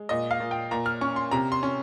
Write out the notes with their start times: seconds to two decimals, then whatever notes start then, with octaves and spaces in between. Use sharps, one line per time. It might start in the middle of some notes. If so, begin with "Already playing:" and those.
Already playing: G#3
0.09 A#2 D#5
0.31 F5
0.40 A#2
0.51 G5
0.71 A#2 A#5
0.86 F6
1.01 C#4 C#6
1.16 C6
1.31 C3 A#5
1.52 C6
1.63 C#4